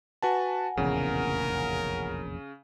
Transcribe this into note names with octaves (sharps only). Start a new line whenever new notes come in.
F#4 B4 F#5 G#5 A5
F1 A#1 E2 C#3 A#4